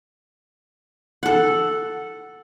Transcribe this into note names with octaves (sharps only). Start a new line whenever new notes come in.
A4 F#5